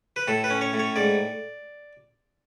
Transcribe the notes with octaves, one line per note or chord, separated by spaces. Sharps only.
B4
A2 A4
B4
C#4
C#5
A2
C#5
G#2 D5